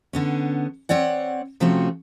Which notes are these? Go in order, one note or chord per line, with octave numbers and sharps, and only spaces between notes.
D3 B3 C#4
C4 C#5 D5 F#5
C3 F3 A3 C4 C#4 F#4